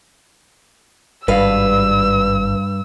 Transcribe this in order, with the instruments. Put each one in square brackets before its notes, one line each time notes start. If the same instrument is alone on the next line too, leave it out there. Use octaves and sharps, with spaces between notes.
[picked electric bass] G#1 [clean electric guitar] G2 [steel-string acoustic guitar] B4 F5 [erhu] E6